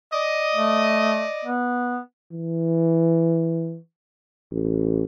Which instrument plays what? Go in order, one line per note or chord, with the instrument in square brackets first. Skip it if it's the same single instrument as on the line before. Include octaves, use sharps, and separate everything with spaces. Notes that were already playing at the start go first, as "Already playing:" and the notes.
[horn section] D5 D#5
[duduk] A3
B3
[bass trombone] E3
A1